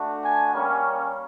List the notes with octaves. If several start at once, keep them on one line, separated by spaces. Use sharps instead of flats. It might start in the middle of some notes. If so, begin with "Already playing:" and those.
Already playing: A3 D4 F#4
G#5
G3 A#3 C#4